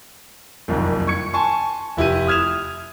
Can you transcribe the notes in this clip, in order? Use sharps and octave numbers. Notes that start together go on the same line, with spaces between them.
F#1 C2 F2 D#3
C#6 G#6 C#7
G#5 A5 C6 C#6
F1 E4 G4 D#7
D#6 F6 G#6 E7 F7